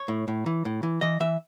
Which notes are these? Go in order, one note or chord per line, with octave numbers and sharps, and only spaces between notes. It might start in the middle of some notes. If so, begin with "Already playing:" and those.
Already playing: C#5
A2
A2
E3
A2
E3
E3 D#5
E3 E5